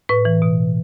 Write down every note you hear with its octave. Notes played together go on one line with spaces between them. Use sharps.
A2 B4
E3
B2